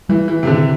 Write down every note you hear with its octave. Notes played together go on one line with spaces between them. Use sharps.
E3 G3
E3
C3
D3 D4